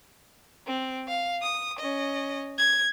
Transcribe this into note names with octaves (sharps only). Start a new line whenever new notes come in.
C4
F5
D#6
C#4 D#5
G#6